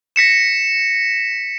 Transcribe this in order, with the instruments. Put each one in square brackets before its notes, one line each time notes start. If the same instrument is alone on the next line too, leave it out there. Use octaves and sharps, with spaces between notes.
[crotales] A#6 B6 C#7 E7